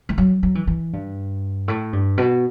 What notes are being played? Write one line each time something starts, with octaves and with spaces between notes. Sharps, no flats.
E3
F#3
F#3
E3
E3
G2
A2
G2
B2